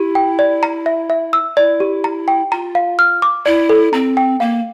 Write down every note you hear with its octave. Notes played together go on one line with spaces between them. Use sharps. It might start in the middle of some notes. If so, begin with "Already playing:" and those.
Already playing: E4 G4
G5
D5
A#5
E5
E5
E6
E4 D5
G4
A#5
G5
F4 A#5
F5
F6
D6
E4 D5
A4
C4 A#5
G5
A#3 F5